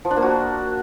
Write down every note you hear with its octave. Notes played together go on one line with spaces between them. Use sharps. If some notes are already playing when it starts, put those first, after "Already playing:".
F3
D4
A#3
F#4